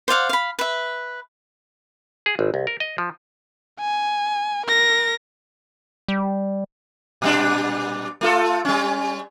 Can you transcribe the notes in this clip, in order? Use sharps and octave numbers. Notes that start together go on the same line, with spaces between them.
C5 D5 F5 F#5
F5 B5
B4 E5
G#4
G#1
C2
A#4
D#5
F3
G#5
A#4 A#6
G3
A#2 G3 D4
A3 F4 A4
G3 C#4